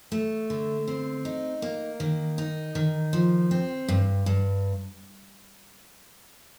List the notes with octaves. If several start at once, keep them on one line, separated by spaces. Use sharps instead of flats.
A3
D3
C4
D#4
A#3
D#3
D#4
D#3
F3
C4
G2
G2